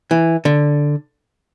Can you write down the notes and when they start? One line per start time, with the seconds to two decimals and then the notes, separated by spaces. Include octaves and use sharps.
0.11 E3
0.45 D3